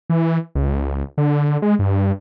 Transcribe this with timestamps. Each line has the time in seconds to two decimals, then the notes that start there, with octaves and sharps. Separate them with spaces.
0.10 E3
0.55 C#2
1.18 D3
1.62 G#3
1.79 G2